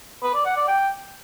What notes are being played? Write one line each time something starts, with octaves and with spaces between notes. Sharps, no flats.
B4
D5
F#5
D5
G5